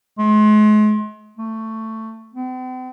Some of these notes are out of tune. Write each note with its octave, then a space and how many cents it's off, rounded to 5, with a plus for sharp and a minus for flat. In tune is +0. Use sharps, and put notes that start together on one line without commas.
G#3 +40
A3 +15
C4 -45